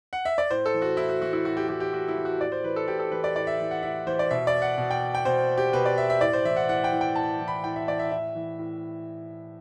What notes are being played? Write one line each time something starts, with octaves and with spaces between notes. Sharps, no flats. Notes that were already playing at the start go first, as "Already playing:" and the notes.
F#5
E5
D5
A2 C5
A4
E3
F#4
A2 E4
F#4
E3 F#4
E4
A2 F#4
G4
E3 G4
G4
A2 F#4
E4
E3
F#4
A2 D5
C5
E3 B4
A4
A2 G4
A4
E3 B4
D5
A2 D5
E5
E3
F#5
A2 E5
E3 C5
D5
B2 E5
D5
F#5
B2
G5
G5
B2 C5
G4
B2 B4
D5
E5
E5
A2 D5
C5
E3 E5
F#5
A2 F#5
G5
E3
G5
A2 A5
E3
B5
A2 G5
E5
E3 D5
E5
A2 E5
E3
A2